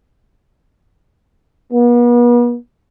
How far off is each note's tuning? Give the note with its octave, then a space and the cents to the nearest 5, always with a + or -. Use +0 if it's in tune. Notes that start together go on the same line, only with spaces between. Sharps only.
B3 -40